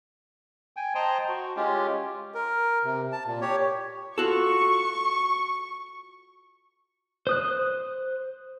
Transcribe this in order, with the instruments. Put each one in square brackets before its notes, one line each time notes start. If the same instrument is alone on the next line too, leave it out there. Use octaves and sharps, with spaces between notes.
[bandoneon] G5 G#5
C5 D#5 G5 A5 A#5 C6
F#4
G#3 C#4 F4 G4
A#4
C3
A5
A#2
G4 C#5
[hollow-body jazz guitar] F4 F#4 A4 [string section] C#6
[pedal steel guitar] C5 D#6 F#6